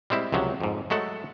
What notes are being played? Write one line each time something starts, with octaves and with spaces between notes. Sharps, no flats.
G3 G#3 C4 E4
C#2 C3 F3 F#3
F2 G#2
F#3 G#3 A3 A4 F#5